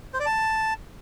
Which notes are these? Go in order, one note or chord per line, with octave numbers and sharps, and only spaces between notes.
C5
D5
A5